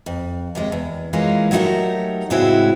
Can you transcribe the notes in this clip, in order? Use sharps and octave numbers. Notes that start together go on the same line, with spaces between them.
F2
D#2 C3 G#3
E2
E3 G#3 A#3 C#4 F4
F#3 A3 D#4 E4 G4 A#4
A2 C#3 G#3 C4 E4 F#4